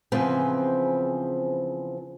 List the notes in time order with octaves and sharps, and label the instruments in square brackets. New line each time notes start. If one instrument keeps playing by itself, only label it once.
[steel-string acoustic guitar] E2 C#3 F3 C4 B4 G#5